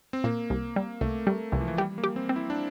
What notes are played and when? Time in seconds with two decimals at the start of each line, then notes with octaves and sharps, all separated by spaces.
0.13 C4
0.24 A#2 A#3
0.50 C2
0.76 G3
1.01 C2 A3
1.27 G3 A3
1.52 C2 E3
1.61 F3
1.68 E3
1.77 G3 G4
1.98 A#3
2.04 G4
2.16 C4
2.29 C4
2.36 E4
2.50 D4